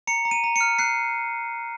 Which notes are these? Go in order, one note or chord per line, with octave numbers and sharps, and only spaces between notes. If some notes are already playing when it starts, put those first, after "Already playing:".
A#5 C#7
A#5
D#7
A#5
F6 C#7
F#6 C7